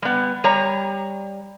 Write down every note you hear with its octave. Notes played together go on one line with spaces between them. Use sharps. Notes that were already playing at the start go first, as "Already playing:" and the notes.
G3 B3
G3 C#5 A#5